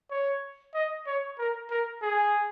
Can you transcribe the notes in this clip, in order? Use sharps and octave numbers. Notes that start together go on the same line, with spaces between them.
C#5
D#5
C#5
A#4
A#4
G#4